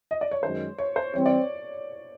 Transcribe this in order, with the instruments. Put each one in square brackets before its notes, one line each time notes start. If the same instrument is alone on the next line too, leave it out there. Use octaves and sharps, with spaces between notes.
[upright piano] D#5
D5
C#5
[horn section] F#2 D#3 G#3 [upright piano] C5
[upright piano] C#5
C5
[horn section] E3 G3 C4 [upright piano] C#5
[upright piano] D5